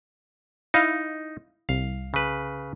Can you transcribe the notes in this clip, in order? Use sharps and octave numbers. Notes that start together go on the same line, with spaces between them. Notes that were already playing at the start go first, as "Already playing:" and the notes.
D#4 E4 D#5 F5
C2 F5
C#3 B4